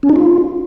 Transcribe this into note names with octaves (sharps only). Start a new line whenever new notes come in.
C#4
D#4
F4